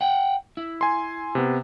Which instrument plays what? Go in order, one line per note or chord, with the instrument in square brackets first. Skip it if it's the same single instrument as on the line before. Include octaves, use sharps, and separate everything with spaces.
[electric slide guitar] F#5 G5
E4
[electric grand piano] G#5 C6
C3 B3